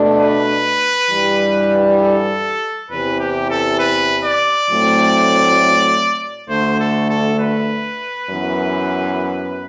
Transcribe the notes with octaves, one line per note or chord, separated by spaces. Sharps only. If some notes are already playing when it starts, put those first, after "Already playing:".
Already playing: B2 A3 D4
B4
G2 E3 G3
A4
E2 C3 E3 B4
G4
A4
B4
D5
A2 F#3 A3 C4
D2 D3 A3 C5
A4
A4
B4
F#2 E3 B3